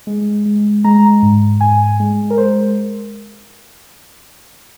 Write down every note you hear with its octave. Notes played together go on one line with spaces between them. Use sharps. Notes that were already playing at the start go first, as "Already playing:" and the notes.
G#3
G#3
G#3 A#5
G#2
G#2 G#5
G#3
A#4
G#3 C5